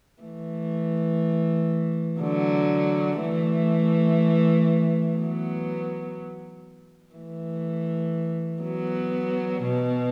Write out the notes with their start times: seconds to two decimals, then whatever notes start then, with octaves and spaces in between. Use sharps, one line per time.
0.23 E3 A3
2.21 D3 F#3
3.20 E3 A3
5.17 F#3 B3
7.14 E3 A3
8.62 F#3 B3
9.62 B2